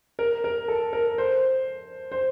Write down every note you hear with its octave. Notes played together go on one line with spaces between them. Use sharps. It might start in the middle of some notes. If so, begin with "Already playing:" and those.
A#4
A#4
A4
A#4
C5
C5